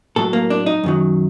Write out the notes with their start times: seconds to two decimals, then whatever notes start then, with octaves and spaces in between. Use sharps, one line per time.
0.16 A2 F#3 A4
0.33 A#3
0.50 D4
0.66 D#4
0.84 F#2 D#3 F#3